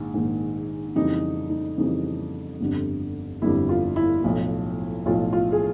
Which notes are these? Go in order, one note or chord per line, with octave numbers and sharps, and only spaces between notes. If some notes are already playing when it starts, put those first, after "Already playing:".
Already playing: A#1 G#2 D#3
A#1 G#2 D#3
F2 C#3 E3 G3 D#4
D#4
F2 C#3 E3 G3 D#4
G1 F2 D3 G3
G1 F2 D3 G3 E4
F4
E4
B1 A2 F3
B1 A2 F3 F4
F4
G#4